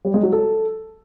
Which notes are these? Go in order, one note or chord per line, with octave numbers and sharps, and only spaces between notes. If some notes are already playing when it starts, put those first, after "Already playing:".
G3
G#3
F#3
A4